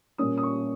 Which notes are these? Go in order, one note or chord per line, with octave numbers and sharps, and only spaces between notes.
A#2 G3 A#3 C#4 D#6
D#6
C#6